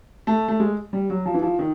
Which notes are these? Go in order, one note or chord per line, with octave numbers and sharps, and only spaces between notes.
A3
A3
G#3
G3
F#3
F3
E3
F3
D#3